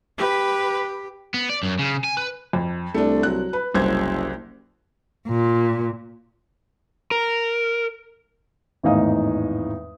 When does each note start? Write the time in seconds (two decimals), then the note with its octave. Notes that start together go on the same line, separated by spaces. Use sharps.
0.18 G4 B4
1.34 B3
1.50 D5
1.63 F#2
1.79 C#3
2.04 G#5
2.17 B4
2.53 F2
2.94 C2 A3 D4
3.23 F#3 F#6
3.53 B4
3.74 F#1 C2 C5 G#6
5.28 A#2
7.11 A#4
8.83 G#1 E2 A2 D#4 F5 D#6